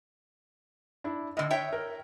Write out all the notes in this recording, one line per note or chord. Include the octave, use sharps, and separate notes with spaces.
D4 E4
A2 D3 D#5
C#5 E5 G5
A#4